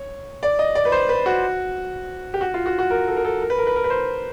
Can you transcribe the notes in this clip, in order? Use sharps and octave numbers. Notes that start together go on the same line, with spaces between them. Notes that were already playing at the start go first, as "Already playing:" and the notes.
Already playing: C#5
D5
D#5
D5
B4
C5
B4
F#4
G4
F#4
F4
F#4
F#4
A#4
A4
A#4
A4
A#4
B4
A#4
B4
A#4
B4
C5